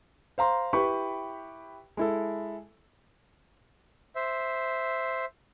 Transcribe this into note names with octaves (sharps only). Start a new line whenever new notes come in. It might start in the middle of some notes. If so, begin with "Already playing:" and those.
C5 F5 A#5 C6
E4 G4 B4 G5 B5 C#6
G#3 E4 A4
C5 E5